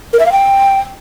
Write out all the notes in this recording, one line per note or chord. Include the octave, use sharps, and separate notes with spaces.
A#4
E5
F5
G5